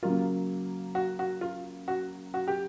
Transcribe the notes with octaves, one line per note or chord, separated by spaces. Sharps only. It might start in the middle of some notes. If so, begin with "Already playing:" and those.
C#3 F#3 A#3 F4
F#4
F#4
F4
F#4
F#4
G4